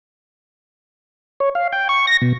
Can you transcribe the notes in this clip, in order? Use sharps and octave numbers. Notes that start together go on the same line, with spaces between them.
C#5
F5
G5
C#6
A#6
B2